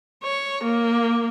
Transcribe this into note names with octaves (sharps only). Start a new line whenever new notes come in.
C#5
A#3